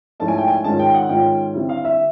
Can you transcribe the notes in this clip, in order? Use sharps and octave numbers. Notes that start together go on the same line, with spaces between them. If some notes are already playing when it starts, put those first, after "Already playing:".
G#2 F3 A3 C#4 E4 A5
G#5
G5
G#5
G#2 D#3 G#3 C#4 F4 A5
G5
F#5
G#2 D#3 G#3 C#4 F4 G5
D3 G3 C4 E4
F5
E5